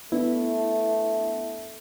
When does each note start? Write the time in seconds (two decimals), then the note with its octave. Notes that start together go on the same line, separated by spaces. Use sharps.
0.12 A3 B3 D4 E4